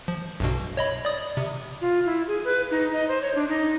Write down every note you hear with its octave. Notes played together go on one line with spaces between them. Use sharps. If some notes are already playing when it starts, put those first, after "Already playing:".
F3
B1 G2 B2
C#5 D#5 B5
D5 D#6
C3
F4
E4
G#4
B4
D#4
D#5
C5
C#5
D4
D#4